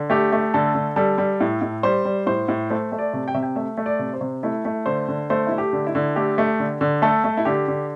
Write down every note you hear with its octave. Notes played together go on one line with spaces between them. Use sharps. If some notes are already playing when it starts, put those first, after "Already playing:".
Already playing: D3
A3 G4
A3
D3 A4
D3
G3 A4
G3
A2
A2
G3 C5
G3
A2 C5
A2
A3 C5
A3
D5
C3
G5
C3 E5
G5
A3 E5
A3
D5
C3
C5
C3
A3 E4
A3
D3 C5
D3
A3 C5
A3 E4
G4
D3
E4
D3
A3 G4
A3
D3
D3
A3 A4
A3
E4
D3 G4
D3